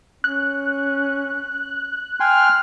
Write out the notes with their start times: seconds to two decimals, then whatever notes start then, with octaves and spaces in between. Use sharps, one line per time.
0.24 C#4 F#6
2.20 G5 G#5 C6 F6